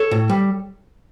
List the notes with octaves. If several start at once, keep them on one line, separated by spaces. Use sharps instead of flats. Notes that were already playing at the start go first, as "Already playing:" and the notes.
Already playing: A4 C#5
A2
G3